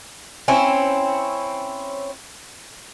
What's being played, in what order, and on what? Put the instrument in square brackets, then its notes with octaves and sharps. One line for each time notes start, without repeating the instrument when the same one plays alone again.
[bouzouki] C4 C#4 E4